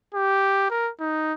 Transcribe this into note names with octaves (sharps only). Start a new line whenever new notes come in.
G4
A#4
D#4